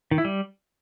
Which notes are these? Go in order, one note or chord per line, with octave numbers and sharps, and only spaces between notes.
D#3
E4
G3